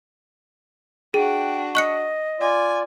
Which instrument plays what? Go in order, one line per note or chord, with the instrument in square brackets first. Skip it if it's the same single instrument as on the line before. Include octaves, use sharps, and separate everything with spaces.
[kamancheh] D4 F#4 [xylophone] G#4 [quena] G5
[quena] D#5 [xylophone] C#6 F#6 C#7
[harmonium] F4 D5 [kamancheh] G#5